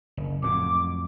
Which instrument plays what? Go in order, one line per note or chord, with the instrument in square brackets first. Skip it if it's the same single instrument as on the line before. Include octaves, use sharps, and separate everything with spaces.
[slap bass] F#1
[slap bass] F2 A2 F#3 [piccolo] D6